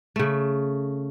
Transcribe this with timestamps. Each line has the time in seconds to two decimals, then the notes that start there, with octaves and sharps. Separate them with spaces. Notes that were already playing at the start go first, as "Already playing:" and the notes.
0.16 C#3 A3